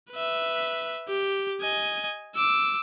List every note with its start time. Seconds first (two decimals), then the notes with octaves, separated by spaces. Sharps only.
0.11 B4 E5
1.08 G4
1.61 D#5 G#5
2.35 D6 E6